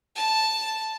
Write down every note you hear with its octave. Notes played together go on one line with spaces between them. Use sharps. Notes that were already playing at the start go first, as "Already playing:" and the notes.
A5